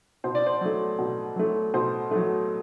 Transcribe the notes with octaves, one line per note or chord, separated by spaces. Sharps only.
B2 C5
D5
C5
F#3 A3
B2
F#3 A3
B2 C5
F#3 A3